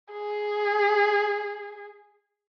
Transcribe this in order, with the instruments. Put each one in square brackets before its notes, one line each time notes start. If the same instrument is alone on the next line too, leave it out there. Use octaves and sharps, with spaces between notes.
[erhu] G#4